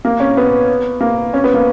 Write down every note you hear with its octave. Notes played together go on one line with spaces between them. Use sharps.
A#3
C#4
B3
A#3
C#4
B3
A#3